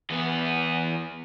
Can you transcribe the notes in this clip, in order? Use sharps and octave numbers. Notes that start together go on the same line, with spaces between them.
E2 B3